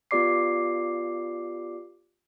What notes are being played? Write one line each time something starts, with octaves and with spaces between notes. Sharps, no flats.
B3 F4 G4 D5 D6 C7